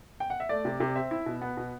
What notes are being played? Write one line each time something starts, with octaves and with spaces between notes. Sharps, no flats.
G5
F#5
E5
A3 D5
C3
C3
C4 E5
E4
B2
B3 F#5
B2